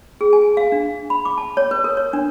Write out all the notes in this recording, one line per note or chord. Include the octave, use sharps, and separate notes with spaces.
G#4
G#5
F5
D4
B5
D6
A5
C#5
B4
A#4
C#5
D4